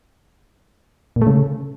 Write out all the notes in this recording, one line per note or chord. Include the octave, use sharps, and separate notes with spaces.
A#2
A3
C#3